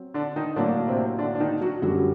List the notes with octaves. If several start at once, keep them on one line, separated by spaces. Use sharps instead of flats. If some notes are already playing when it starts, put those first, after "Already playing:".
Already playing: F#3 C4
D3 D4
D#3 D#4
A2 D3 F#3 A#3 D4
D4
C3 C4
D3 D4
D4
D#3 D#4
F#3 F#4
F#2 D3 F#3 G3 F#4